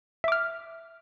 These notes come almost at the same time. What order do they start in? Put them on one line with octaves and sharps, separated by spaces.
E5 D6 F6